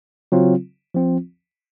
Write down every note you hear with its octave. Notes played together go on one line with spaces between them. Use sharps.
C#3 F#3 C4 F4
F3 C4 F4